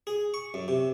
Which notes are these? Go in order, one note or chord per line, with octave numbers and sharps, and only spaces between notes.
G#4
C#6
F#2
C3